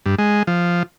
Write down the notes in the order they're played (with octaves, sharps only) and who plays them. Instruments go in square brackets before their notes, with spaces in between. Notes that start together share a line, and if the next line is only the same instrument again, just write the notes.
[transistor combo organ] G2
G#3
F3